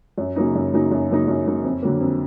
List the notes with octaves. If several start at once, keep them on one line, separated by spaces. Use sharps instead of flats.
F#2
C#3 F#3 A#3 D#4
F#2
C#3 F#3 A#3 D#4
F#2
C#3 F#3 A#3 D#4
F#2
C#3 F#3 A#3 D#4
F2
D3 F#3 A#3
F2